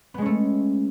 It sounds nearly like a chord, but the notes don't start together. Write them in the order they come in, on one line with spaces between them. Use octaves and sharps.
B3 G#3 C#4 A3